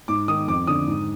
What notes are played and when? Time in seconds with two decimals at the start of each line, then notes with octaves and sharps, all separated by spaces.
0.08 G#2 D6
0.28 D#3 D#6
0.48 F2 D6
0.67 D3 D#6
0.88 G#2